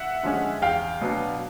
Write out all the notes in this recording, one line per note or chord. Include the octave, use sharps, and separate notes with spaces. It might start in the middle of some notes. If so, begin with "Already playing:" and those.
Already playing: E5 F#5
D3 F3 G#3 C#4
E2 F5 G5
B2 F#3 B3 D4